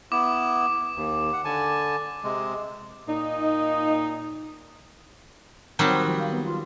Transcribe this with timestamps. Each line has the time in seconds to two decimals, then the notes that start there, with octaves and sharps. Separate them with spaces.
0.12 B3 E4 D6
0.96 D#2
1.33 F#5
1.45 D3 G#5 A5
2.24 C3 G#3
3.07 A#2 D#4
5.79 D#3 F#3 G3 C4
6.06 F3
6.19 F5
6.31 B3
6.45 F4